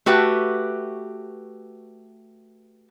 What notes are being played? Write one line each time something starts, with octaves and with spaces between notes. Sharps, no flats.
A3 F#4 G4 B4 E5